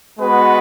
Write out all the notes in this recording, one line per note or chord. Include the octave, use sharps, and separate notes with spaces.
G#3 B3 F#4 B4